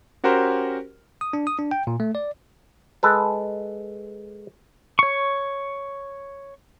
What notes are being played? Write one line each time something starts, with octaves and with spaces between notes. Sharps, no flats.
C#4 F#4 G4 A#4 C5
D#6
D4
D#6
D4
G5
A#2
A3
D5
G#3 A4 B4
C#5 C#6